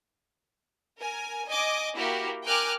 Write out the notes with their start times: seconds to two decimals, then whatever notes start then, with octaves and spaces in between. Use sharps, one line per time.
0.99 A#4 G#5
1.49 D#5 G#5 D6
1.96 A#3 E4 F#4 G4 A#4
2.46 A#4 G5 G#5 D6 F6 F#6